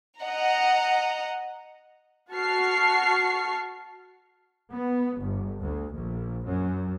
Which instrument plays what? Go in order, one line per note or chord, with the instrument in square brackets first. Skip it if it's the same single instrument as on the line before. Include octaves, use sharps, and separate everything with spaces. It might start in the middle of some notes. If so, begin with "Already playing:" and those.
[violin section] D#5 F#5 A#5
F#4 A5 C#6 F6 C7
[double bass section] B3
G1
D2
A#1
F#2